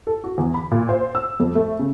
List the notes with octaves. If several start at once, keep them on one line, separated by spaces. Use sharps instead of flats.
A4
F#4
E2
B5
A#2
C5
E6
F2
A3
C#3